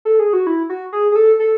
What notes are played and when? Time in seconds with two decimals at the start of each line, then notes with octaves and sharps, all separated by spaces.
0.05 A4
0.19 G#4
0.33 F#4
0.47 E4
0.69 F#4
0.92 G#4
1.12 G#4
1.16 A4
1.39 A4